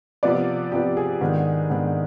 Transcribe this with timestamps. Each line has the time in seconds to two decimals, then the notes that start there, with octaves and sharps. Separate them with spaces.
0.23 C3 F3 B3 D5
0.72 C3 F3 B3 G4
0.97 G#4
1.21 G#2 D#3 B3 D4
1.70 G#2 D#3 B3 D4